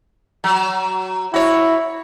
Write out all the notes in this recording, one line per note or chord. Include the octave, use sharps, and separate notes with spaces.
F#3
E4 F#4 C#5